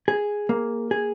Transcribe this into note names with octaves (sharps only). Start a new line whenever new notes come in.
G#4
A#3
G#4